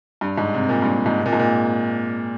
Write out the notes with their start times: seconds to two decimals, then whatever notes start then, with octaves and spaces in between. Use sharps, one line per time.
0.21 G2
0.38 G#2
0.54 C3
0.69 A#2
0.82 G2
1.06 G#2
1.18 C3
1.26 A#2
1.33 G#2
1.39 A#2